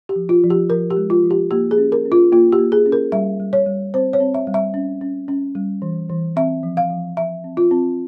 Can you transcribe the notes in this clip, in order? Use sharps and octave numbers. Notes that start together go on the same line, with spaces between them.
G4
F3
F4
F3
G4
F3 A#4
G4
G#3
F4
F3
G4
A#3 G4
G#4
C#4
A#4
C#4
F4
A#3 F4
G4
A#3
G#4
C#4
A#4
G3 E5
G3
C#5
G3
C4 C5
C#5
C4
E5
G3
E5
C#4
C#4
C#4
G3
E3
E3
C4 E5
F3
F5
F3
F3 E5
C4
F4
C4